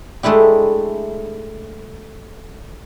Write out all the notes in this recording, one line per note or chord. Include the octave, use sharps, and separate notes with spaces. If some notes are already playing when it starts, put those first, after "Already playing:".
G#3 A3 D4 E4 G4